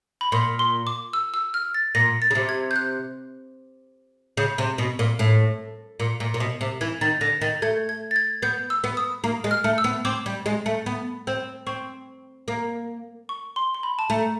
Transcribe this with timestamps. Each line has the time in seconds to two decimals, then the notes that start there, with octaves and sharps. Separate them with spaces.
0.21 B5
0.32 A#2 C6
0.59 C6
0.87 D6
1.13 E6
1.34 E6
1.54 F6
1.74 A6
1.95 A#2 A#6
2.22 A6
2.31 C#3
2.35 C3
2.49 G#6
2.71 G6
2.76 F#6
4.37 C#3 G6
4.58 C3
4.78 B2
4.99 A#2
5.19 A2
6.00 A#2
6.20 A#2
6.34 A#2
6.40 B2
6.61 C3
6.81 E3 G#6
7.01 D#3 A6
7.21 D3 A#6
7.41 D#3 A6
7.62 A3 G#6
7.89 G#6
8.11 A6
8.16 G#6
8.42 B3 G6
8.70 E6
8.84 B3
8.97 D#6
9.24 A#3
9.44 G#3
9.51 F6
9.64 A3
9.78 E6
9.84 B3
10.05 C4 D6
10.26 G3
10.46 G#3
10.66 A3
10.86 B3
11.27 C4
11.67 C4 C#6
12.48 A#3
13.29 C#6
13.56 C6
13.75 C6
13.83 B5
13.99 A5
14.10 A3 A#5